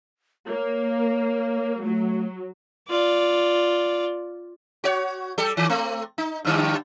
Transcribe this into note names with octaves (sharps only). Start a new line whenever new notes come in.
A#3 C#5
F#3 A3
F4 D5
F#4 C#5
G3 G4 A4
D#3
A3 C4
D#4
G2 D3 G3